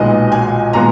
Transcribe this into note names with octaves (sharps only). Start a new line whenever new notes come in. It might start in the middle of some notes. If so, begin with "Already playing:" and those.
Already playing: B1 A#2 G#3 B3 D#4 D#5
G#5
A#2 G#3 B3 A#5